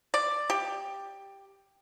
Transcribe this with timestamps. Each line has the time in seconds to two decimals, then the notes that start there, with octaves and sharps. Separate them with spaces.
0.14 D5
0.50 G4